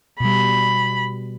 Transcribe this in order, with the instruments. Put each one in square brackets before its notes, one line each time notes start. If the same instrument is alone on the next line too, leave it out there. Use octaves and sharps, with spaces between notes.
[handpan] B2 G3 [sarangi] B5